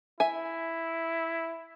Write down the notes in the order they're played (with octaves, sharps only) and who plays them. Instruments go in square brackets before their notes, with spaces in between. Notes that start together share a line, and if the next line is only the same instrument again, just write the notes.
[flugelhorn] E4 [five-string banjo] E5 G#5